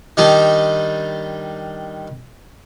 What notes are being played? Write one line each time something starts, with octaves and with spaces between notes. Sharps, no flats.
D#3 G3 D4 D#4